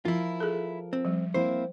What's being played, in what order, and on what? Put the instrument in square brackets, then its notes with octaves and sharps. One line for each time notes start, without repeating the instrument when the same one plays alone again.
[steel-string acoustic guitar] F3 A#4 [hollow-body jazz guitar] E4 F4
[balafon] G#4 A4
[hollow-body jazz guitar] C4
[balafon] F3 G3
[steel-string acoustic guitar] A#3 C4 E4 [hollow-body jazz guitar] C5